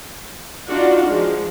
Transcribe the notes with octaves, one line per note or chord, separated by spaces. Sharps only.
D4 D#4 F4 F#4 D5
F3 G#3